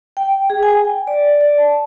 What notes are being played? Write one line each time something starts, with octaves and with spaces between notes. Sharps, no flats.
G5
G#4
G#5
G5
D5
D5
A5